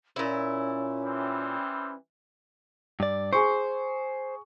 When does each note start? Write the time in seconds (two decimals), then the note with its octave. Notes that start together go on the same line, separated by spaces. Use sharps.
0.16 A#2 C#4 E4
1.04 E3 G3 C4
3.00 G2 D5
3.33 G#4 C5 C#6